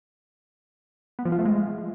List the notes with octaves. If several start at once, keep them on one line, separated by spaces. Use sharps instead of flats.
B3
F3
F4
A3
G#3